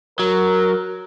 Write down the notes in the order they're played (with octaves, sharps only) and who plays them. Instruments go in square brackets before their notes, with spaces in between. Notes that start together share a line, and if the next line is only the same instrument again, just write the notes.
[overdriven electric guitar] F#3 [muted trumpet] A#4